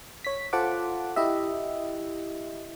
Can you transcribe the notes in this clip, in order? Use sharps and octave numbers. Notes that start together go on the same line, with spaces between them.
C#5 B6
F4 A4 C5 F#5 A5 D6
E4 G4 D#5 E5